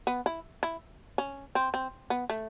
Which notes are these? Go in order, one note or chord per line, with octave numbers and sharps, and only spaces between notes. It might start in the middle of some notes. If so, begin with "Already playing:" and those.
B3
E4
E4
C#4
C4
C4
B3
A3